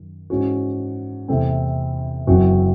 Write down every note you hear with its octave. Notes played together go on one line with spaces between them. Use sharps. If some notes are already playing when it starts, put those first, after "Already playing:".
Already playing: F#2 D#3
G#2 E3 G#3 C#4 F#4
E2 C3 E3 A3 C4
F#1 F#2 E3 C4 F#4